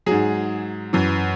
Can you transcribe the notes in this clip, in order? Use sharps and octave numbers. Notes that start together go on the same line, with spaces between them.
G#2 F#3 G#4
F#2 E3